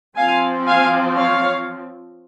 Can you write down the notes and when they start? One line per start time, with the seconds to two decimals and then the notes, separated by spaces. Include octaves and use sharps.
0.16 F3 C4 F5 G#5
0.67 F5 G#5
1.16 C#5 F5